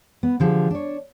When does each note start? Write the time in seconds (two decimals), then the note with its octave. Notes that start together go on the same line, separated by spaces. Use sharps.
0.23 B3
0.40 D3 F3 G4 G#4
0.70 D4 C#5